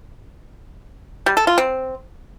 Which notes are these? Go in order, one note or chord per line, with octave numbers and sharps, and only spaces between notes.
G3
A4
F4
C4